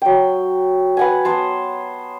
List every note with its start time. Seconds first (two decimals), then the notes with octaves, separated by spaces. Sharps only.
0.02 F#3 G5
0.97 B4 F#5 G#5
1.25 B3 C5 A5